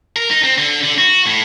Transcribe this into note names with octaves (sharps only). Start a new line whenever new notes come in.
A#4
D#4
C4
D3
D3
F#4
A2